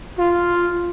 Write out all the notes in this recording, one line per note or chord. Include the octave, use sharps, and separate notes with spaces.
F4